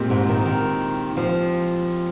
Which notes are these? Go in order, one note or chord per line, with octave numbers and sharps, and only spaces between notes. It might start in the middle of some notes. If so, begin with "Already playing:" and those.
Already playing: A#2 G#3 C4 G4 A#4
G#2
D#3
D#3
F3